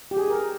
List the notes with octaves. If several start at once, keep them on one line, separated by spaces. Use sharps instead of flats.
G4
G#4
A#4